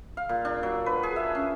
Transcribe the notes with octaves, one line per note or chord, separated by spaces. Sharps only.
F5
A#2
D4
F#3
B4
G#4
E5
C#4